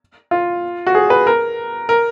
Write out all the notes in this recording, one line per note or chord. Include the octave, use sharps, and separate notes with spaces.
F4
F#4
G#4
B4
A#4
A#4